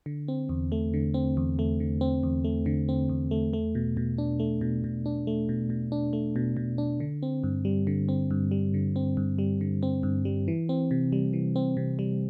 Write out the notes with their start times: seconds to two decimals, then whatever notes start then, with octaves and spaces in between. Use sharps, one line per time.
0.06 D3
0.28 C4
0.49 E2
0.72 A3
0.94 D3
1.14 C4
1.37 E2
1.59 A3
1.80 D3
2.01 C4
2.23 E2
2.44 A3
2.66 D3
2.89 C4
3.09 E2
3.31 A3
3.53 A3
3.75 B2
3.97 B2
4.18 D4
4.40 A3
4.61 B2
4.84 B2
5.06 D4
5.27 A3
5.49 B2
5.70 B2
5.92 D4
6.13 A3
6.36 B2
6.57 B2
6.78 D4
7.00 D3
7.23 C4
7.44 G2
7.65 G3
7.87 D3
8.09 C4
8.31 G2
8.51 G3
8.74 D3
8.96 C4
9.17 G2
9.38 G3
9.61 D3
9.83 C4
10.03 G2
10.25 G3
10.48 E3
10.69 C4
10.91 C3
11.12 G3
11.33 E3
11.56 C4
11.77 C3
11.99 G3